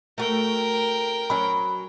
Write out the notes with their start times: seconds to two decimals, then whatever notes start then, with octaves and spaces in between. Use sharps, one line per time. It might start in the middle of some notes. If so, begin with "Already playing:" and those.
0.18 A3 F#4 A#4 G5
1.30 F#3 C#4 B5